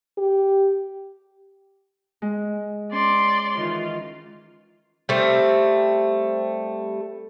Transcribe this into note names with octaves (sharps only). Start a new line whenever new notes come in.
G4
G#3
C#4 D5 C6
D#3 E3 F4
G3 A3 C4